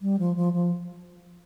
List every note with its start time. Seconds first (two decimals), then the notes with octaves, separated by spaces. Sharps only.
0.02 G3
0.19 F3
0.36 F3
0.53 F3